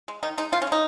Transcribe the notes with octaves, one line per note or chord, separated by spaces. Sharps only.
G#3
D#3 D#4
G#3 D#4
D#3 F4
C#4
G#3 D#4